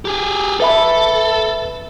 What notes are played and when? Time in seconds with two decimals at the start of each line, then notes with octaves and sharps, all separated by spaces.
0.05 G4 G#4
0.60 A4 B4 E5 B5